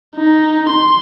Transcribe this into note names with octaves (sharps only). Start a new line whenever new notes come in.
D#4
C6